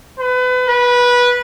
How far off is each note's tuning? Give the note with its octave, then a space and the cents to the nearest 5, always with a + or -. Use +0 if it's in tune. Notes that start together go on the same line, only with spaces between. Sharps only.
B4 +30
B4 -15